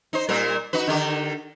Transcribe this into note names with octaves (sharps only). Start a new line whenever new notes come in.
D#4 C5
A#2 G3 A#4
D#4 F#4 B4
D3 D#3 G4